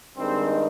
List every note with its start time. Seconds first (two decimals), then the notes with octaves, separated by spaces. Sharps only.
0.16 G2 D#3 G#3 C4